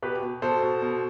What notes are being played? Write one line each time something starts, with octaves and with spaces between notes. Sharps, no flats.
B2 G4 B4
B2
B2 A4 C5
B2
B2